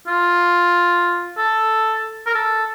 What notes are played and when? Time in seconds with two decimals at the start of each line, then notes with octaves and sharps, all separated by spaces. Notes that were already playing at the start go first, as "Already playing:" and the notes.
0.08 F4
1.38 A4
2.26 A#4
2.35 A4